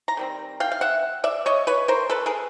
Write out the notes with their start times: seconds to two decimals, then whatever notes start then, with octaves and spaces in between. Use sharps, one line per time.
0.08 A#5
0.17 D#3 G3 C4
0.60 F5 G5
0.72 F5
0.81 E5 F#5
1.24 D5 E5
1.46 C#5 D#5
1.67 B4 C#5
1.88 A#4 C5
2.10 A4 B4
2.26 G#4 A#4